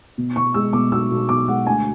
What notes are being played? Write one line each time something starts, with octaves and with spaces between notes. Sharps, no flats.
B2
B2 C#6
G#3 E6
B2 D6
B1 E6
B1
B1 D6
G#3 F#5
D2 G#5